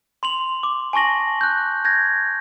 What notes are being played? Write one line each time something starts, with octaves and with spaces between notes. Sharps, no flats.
C6 F7 F#7
D6
G#5 A5 C#6 A#6 F#7
F#6 G6
G6 G#6 A#6